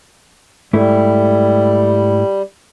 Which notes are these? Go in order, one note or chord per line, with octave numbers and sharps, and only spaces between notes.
G#2 G3 A3 E4